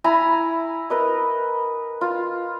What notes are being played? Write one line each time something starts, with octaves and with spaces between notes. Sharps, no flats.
E4 G#5 A#5 B5
A#4 B4 D#5
F4